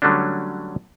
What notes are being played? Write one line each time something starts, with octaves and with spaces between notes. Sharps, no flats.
D3 F#3 G3 A3 C#4 D4